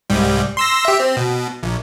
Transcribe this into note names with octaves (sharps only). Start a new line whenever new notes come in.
C2 G#2 G3
C6 E6 A#6
G4 E5
C4
B2
A#1